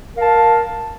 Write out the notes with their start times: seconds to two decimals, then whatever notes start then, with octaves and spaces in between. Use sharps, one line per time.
0.13 A#4
0.17 F5
0.21 A5